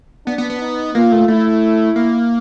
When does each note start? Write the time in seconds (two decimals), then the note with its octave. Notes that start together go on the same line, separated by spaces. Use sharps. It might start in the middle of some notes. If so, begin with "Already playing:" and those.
0.26 B3 D4
0.38 B3
0.50 B3
0.61 D#4
0.94 A#3 F4
1.12 A3
1.28 A3 E4
1.96 A#3